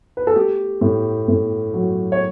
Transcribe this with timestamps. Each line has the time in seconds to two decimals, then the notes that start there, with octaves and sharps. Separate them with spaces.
0.17 B4
0.27 A4
0.36 A3 G4
0.81 A2
1.28 A2
1.74 F#3
2.12 C#5